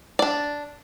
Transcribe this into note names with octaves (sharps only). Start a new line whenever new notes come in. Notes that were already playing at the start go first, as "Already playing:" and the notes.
D4 D5